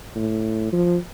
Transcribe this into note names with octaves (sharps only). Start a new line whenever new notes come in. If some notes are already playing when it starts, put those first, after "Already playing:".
A2
F3